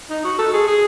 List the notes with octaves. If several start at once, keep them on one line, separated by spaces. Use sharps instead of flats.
D#4
F#4
A4
G#4
G#4